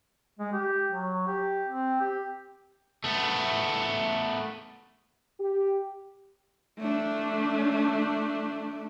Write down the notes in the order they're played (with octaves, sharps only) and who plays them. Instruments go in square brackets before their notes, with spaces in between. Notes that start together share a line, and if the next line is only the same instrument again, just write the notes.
[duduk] G#3
G4
F#3
G4
C4
G4
[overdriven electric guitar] A3 B3
[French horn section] G4
[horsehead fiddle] A3 D4